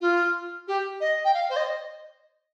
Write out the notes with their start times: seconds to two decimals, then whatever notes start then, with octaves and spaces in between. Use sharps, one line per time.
0.01 F4
0.68 G4
1.00 D#5
1.25 G5
1.34 F5
1.49 C5
1.56 D#5